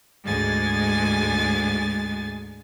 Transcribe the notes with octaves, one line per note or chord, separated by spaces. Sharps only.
D2 G#2 G#3 G#5 A6